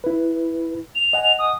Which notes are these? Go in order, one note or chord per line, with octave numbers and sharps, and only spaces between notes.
E4 B4
F7
D#5 F#5 G#5
D#6